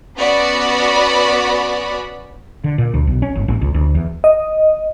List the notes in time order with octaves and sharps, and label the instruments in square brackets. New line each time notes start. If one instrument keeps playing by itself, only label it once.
[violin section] B3 C#4 F#4 D5 F#5 B5
[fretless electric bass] D3
A#2
D2
B1
C#4
G1
A1
C#2
D2
E2
[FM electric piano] D#5